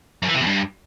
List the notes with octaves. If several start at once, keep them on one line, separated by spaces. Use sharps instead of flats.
F#2
E3
C3
E2
G2